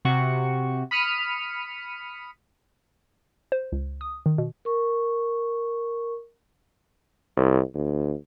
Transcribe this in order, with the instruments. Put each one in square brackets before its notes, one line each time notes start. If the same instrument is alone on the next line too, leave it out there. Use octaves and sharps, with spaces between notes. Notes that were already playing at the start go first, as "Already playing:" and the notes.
[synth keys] C3 F#4 C#6
B5 D#6 F6 B6 C#7 D#7
[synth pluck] C5
C#2
D#6
D#3
B2
[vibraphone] A#4 C#6
[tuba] C2
D2